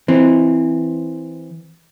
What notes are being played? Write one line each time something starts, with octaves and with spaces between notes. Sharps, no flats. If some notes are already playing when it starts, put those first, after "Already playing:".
E3 C4